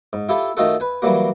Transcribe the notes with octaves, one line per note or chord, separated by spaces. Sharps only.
G#2
E4 F4 G4 A4 G#5
D#3 A3 D#4 F4 F#4 A4
B4 G#5
E3 F#3 G3 A#3 F#4